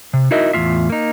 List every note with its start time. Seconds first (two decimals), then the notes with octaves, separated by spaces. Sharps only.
0.13 C3
0.31 D#4 E4 F#4 A#4 D#5 E5
0.53 E2 A2 C4 F4 E5
0.90 A#3 D#4